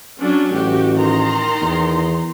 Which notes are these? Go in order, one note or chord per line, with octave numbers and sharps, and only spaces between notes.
F#3 C#4 D4
A1 F#4 G4
D#3 A#5 C6
E2